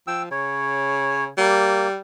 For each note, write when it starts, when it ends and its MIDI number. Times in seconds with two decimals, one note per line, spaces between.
0.07 0.27 53
0.07 0.22 79
0.07 0.22 88
0.31 1.28 49
0.31 1.24 73
1.38 1.98 55
1.38 1.88 58